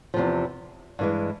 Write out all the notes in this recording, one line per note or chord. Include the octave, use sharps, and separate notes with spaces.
E2 C3 F3
G2 E3 G#3